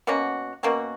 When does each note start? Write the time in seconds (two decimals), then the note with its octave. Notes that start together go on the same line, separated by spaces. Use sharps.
0.07 B2 A#3 C#4 F#4
0.63 B2 A#3 C#4 F#4